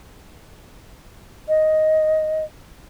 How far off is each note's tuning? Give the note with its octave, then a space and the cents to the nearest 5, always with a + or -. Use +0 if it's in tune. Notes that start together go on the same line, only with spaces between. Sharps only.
D#5 +5